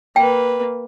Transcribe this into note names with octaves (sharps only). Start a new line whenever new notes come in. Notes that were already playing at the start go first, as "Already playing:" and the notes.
A#3 B4 G5